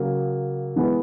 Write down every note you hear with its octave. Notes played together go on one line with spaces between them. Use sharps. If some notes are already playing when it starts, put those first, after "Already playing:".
Already playing: C#3 F#3 A#3
E3 G#3 B3